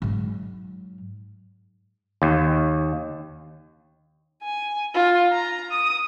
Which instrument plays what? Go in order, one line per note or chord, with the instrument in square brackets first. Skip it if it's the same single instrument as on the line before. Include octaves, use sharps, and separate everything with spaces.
[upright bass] G#2 F#3
[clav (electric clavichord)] D#2
[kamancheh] G#5
F4
A#5
D#6